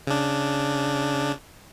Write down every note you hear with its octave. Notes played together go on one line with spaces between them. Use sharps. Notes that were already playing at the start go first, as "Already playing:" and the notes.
C#3 D4